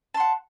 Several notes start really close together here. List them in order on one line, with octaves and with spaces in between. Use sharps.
A5 C6 F#5